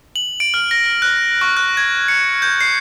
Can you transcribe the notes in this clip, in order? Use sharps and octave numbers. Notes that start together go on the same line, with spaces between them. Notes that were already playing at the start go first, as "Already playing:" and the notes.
F#7
D7
F6
A#6
F#6
C#6
F#6
G#6
C#7
G6
C7